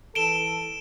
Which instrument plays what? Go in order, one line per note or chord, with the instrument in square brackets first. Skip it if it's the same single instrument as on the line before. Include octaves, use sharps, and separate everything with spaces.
[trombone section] E3 A4 [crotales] D7 E7 G7